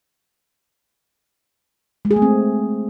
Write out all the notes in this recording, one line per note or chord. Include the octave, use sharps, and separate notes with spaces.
G#3
G#4
A3
C4